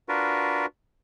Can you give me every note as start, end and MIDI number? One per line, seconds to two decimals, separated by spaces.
0.09 0.66 62
0.09 0.66 65
0.09 0.66 66
0.09 0.66 70
0.09 0.66 71